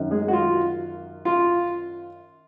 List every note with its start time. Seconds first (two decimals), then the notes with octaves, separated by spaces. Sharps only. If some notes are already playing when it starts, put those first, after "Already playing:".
Already playing: F#2 D#3
0.11 G#3 G#4
0.28 F#4
0.33 F4
1.25 F4